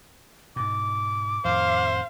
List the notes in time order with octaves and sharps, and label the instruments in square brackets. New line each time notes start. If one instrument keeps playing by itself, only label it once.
[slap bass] G#2 B2 [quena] D6
[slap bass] F2 A2 D#3 [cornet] C5 [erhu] F5